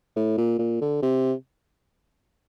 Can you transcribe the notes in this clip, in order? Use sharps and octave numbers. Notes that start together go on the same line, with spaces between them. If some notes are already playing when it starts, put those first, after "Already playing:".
A2
A#2
A#2
D3
C3